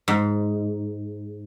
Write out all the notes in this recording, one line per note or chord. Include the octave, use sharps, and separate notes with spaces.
G#2